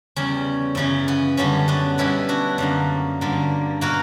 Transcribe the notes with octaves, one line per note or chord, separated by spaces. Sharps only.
E2 C#3 G3 C#4
F#2 C#3 E3 B3 C#4
B3
F#2 D3 G3 C#4
B3 D4
B2 G3 B3 C#4 E4
D4 F#4
F#2 D3 A#3
G2 D3 A#3
B2 A#3 F#4 A#4